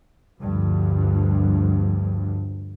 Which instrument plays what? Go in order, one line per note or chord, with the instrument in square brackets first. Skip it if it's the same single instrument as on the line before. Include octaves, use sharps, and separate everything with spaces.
[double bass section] D2 G2 F3